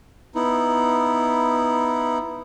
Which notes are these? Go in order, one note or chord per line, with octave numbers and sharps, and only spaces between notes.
B3 D#4 E4